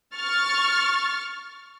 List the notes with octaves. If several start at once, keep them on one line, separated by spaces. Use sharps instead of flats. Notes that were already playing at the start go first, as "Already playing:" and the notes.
C#6 F6 A6